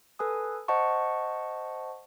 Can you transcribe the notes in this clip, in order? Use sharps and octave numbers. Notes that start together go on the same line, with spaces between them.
A4 B4 G#5 D#6
C5 D#5 F#5 A5 C#6